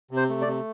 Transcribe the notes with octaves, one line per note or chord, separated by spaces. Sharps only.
C3
C5
A3
D5
C3